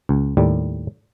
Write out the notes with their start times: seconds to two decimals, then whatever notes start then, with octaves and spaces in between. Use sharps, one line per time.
0.09 C#2
0.37 D#2 A2 G3